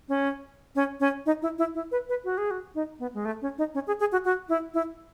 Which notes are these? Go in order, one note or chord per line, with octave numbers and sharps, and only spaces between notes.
C#4
C#4
C#4
D#4
E4
E4
E4
B4
B4
F#4
G#4
F#4
D#4
B3
G#3
A3
C#4
D#4
C#4
G#4
G#4
F#4
F#4
E4
E4